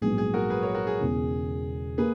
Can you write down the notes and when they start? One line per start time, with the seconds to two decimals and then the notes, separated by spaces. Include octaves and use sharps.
0.01 A#1 G#2 F#3 B3 G#4
0.18 G#4
0.34 F#4 A#4
0.50 G#4 B4
0.62 A#4 C#5
0.75 F#4 A#4
0.87 G#4
1.00 E1 E2 C#3
1.98 A#3 G#4 B4